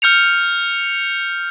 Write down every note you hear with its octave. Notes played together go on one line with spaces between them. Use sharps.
F6 G6 C#7 F7